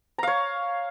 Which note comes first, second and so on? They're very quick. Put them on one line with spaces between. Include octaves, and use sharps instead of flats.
A#5 F5 C#5